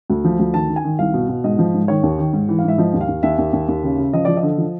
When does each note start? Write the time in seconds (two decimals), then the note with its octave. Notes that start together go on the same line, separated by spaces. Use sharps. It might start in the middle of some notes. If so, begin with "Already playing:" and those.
0.10 D2
0.24 F3
0.39 D2
0.54 D#3 A5
0.69 D#3
0.76 G#5
0.84 D#3
0.99 C2 F5
1.14 B2
1.29 B2
1.44 G#2 D#5
1.59 F3
1.74 G#2
1.88 D#3 C#5
2.03 D#2
2.19 D#3
2.33 G#2
2.49 E3
2.59 F5
2.64 G#2 E5
2.78 F3 D#5
2.94 D#2
3.01 F5
3.08 D#2
3.23 D#2 E5
3.39 D#2
3.53 D#2
3.68 D#2
3.84 C#3
3.98 C#3
4.13 F3 D#5
4.25 F3 D5
4.37 D#5
4.43 D3
4.58 F3